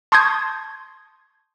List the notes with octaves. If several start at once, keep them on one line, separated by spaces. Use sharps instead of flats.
A5 C6 C#6 D#6 G6 G#6